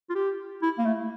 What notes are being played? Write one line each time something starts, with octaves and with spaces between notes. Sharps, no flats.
F4
G4
E4
A#3
A3